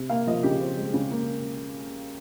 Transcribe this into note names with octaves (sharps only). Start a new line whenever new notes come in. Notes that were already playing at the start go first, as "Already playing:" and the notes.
Already playing: C3
A#3 F5
F3 D#5
C#3 G4
C4
G#3
C#3
A#3